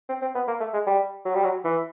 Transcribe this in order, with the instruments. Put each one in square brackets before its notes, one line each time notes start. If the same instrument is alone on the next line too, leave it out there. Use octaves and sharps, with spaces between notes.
[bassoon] C4
C4
B3
A#3
A3
G#3
G3
F#3
G3
F#3
E3